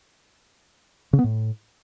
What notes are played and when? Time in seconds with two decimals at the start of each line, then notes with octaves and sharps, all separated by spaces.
1.13 C#3
1.19 B3
1.24 A2